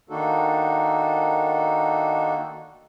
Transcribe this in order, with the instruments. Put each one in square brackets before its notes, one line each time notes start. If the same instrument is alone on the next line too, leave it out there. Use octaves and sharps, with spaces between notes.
[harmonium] D#3 A#3 D4 D#4 F#4 A4